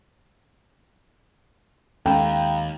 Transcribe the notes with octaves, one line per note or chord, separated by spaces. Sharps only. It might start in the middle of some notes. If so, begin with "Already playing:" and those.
D#2 G#3 C#4 A4 F5 G5 A#5 B5